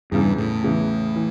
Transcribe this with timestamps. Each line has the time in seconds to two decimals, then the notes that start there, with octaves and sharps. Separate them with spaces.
0.11 E2 G2 C#3 E3
0.38 A2
0.64 E2 C#3 E3
1.16 E3